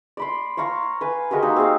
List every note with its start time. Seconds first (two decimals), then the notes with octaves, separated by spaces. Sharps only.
0.17 D5 B5 C6
0.57 C#5 F5 A#5 C#6
1.01 B4 G#5
1.31 G#3 F#4 G4 A#4
1.42 A#3 D#4
1.56 C4 G#4 F5